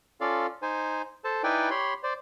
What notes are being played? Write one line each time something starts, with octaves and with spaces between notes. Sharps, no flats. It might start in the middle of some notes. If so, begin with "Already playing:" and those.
C#4 F4 A4 D5 F5
D#4 C5 G#5
A4 C5 A5
D#4 E4 B4 D5 G5 G#5
G4 C#5 B5 C6
C5 D5